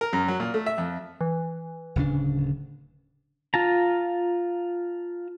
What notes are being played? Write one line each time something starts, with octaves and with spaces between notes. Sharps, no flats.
A#4
F#2
F#3
A#2
A3
E5
F2
E3
D1 C#3 D4
F4 A5 A#5